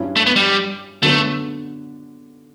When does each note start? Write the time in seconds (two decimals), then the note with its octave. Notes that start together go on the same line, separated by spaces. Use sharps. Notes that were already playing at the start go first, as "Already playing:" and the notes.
Already playing: G2 F#3 C#4 E4
0.16 A3
0.26 B3
0.36 G3
1.02 D3 F#3 A3 B3